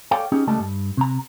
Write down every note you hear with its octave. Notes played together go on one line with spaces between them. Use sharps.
A4 C#5 D5 F5 G5
C#4 D#4 G4 G#4
C#2 G3 A3 D#5 A5
G2
C3 A#5